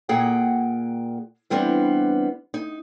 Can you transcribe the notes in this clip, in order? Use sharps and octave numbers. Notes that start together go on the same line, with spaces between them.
A#2 A#3 G#4 F#5 G5
E3 G3 B3 C4 D4
D#4